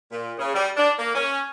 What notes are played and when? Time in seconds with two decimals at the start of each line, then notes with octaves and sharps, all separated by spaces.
0.12 A#2
0.39 C#3
0.55 G3
0.76 D4
0.98 A#3
1.15 C#4